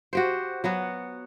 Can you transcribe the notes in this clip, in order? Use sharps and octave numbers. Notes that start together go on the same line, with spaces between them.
F#4 G4 C5
F#3 B3 F#4